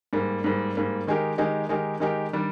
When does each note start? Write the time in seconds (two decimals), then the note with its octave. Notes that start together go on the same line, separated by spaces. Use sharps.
0.13 G#2 G3 A#3
0.44 G#2 G3 A#3
0.75 G#2 G3 A#3
1.07 D#3 G#3 D#4 G4 A#4
1.38 D#3 G#3 D#4 G4 A#4
1.69 D#3 G#3 D#4 G4 A#4
2.00 D#3 G#3 D#4 G4 A#4
2.33 D#3 G3 D4